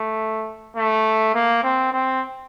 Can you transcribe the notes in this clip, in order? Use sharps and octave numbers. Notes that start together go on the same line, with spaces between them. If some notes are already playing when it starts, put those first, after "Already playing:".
Already playing: A3
A3
A#3
C4
C4